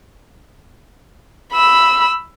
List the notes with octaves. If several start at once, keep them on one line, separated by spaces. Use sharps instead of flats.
B5 E6